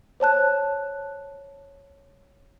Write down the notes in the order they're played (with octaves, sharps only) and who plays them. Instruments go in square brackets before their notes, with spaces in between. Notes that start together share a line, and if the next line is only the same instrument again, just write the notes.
[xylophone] C5 C#5 A5 F#6